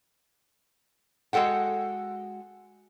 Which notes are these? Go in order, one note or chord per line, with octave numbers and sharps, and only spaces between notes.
G#3 F#4 A4 F#5 G5